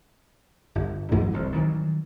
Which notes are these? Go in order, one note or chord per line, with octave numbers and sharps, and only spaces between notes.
G1
G2 E3 F#3 G#3
D1 C2
D#3 E3 F#3